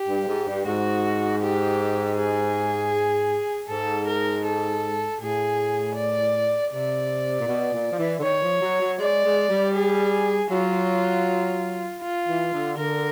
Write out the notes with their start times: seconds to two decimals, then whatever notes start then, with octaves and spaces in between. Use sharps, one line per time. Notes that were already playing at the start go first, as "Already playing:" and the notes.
Already playing: G4
0.09 G2
0.28 G#2
0.47 G2
0.66 G#2 F#4
1.42 G4
2.18 G#4
3.68 G#2 A4
4.07 A#4
4.45 A4
5.21 A2 G#4
5.96 D5
6.72 C3 D5
7.40 A#2
7.47 B2
7.73 A#2
7.92 F3
7.99 E3
8.19 D3
8.23 D#3 C#5
8.43 F3
8.61 F#3
8.81 F#3
8.99 G#3 D5
9.25 G#3
9.49 G3
9.74 G#4
10.50 F#3 F4
12.02 F4
12.28 E3
12.53 D3
12.78 D3 A#4